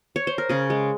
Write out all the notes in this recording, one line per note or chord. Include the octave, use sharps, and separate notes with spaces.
C#5
C5
A#4
C#3 G#4
G#3